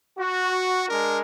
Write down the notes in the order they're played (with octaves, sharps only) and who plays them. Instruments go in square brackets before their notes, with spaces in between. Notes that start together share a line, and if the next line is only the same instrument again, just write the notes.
[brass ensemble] F#4
G#3 D4 A#4